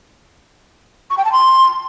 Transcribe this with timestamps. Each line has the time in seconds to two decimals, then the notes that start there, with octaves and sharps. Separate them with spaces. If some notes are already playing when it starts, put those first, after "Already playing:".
1.10 C#6
1.18 G5
1.25 A5
1.32 C6